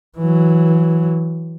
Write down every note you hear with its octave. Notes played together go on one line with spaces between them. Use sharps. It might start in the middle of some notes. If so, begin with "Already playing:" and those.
E3 F#3